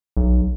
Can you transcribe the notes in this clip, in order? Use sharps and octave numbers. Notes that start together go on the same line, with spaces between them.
B1